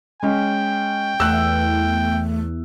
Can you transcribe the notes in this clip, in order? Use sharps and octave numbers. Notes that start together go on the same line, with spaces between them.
G#3 C#4 G5
E2 A3 E6 F#6